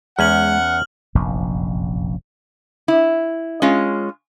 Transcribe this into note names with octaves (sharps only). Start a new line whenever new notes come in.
E2 G#3 C#4 F#5 F6 F#7
F1 A#1 F#2
E4
G#3 C#4 F4